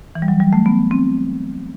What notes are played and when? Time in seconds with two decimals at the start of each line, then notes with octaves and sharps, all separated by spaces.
0.15 E3
0.22 G3
0.28 F#3
0.40 G3
0.53 A3
0.66 B3
0.91 C4